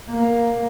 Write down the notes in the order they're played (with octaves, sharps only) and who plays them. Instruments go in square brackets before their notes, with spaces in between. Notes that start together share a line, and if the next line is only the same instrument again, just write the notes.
[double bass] A#3